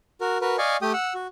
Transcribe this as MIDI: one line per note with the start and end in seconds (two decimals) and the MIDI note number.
0.21 0.38 66
0.21 0.38 70
0.41 0.56 66
0.41 0.56 70
0.41 0.56 71
0.58 0.77 74
0.58 0.77 75
0.58 0.77 77
0.58 0.77 80
0.58 0.77 85
0.82 0.92 57
0.82 0.92 67
0.82 0.92 79
0.82 0.92 87
0.93 1.14 78
0.93 1.14 88
1.14 1.27 66